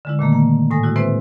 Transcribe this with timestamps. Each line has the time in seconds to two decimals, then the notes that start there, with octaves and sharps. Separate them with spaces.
0.05 D3 G#3 E4
0.19 A#2 D#3 A3 A#3
0.33 A#3
0.71 A2 G#5 D#6 A#6
0.83 G#3 E4 F#4
0.96 C4 E4 B4 C5 E5